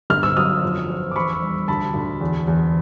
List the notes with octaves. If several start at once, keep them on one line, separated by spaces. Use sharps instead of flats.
G1 F6
E6
F#3 D#6 F6
F2
F2
D6
E2 B5 C#6
G3
D2 A5 B5
D2
E2
E2